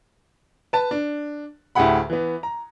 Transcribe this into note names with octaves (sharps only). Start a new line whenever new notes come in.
B4 A5
D4
D2 A2 G4 G#4 F#5 B5
E3 B3
A#5